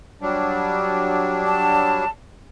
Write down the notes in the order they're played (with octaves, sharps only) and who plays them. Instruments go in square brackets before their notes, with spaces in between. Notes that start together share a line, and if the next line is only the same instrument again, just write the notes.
[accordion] F#3 G3 D4
[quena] A5